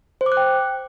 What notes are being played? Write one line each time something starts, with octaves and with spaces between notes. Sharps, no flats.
C5
D6
F#6
G5